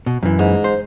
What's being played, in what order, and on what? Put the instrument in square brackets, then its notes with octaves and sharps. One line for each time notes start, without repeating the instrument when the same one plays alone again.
[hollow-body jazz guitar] B2
F#2 E3
[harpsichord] G#2
[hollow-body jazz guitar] C5